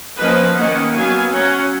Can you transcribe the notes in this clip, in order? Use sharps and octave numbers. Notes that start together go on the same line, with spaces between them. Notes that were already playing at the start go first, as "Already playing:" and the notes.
F3 A#3 C#4 B4 D#5
D#3 A#3 C#4 D#5 F#5
F#3 B3 F5 G#5
F#3 C#4 F#5 A#5